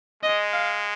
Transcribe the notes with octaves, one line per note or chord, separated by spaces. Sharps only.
G#3 D#5
F5